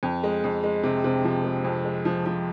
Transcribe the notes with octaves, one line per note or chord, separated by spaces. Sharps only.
F2
G#3
F2
G#3
C3
C3
F3
G#3
F2
G#3
F3
F3